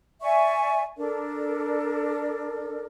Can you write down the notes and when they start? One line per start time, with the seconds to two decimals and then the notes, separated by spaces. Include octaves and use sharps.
0.22 D5 E5 G#5 C#6
0.97 D4 A4 A#4 D5